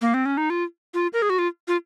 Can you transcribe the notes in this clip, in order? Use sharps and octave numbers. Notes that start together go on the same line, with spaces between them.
A#3
C4
C#4
D#4
F4
F4
A#4
G#4
F#4
F4
F4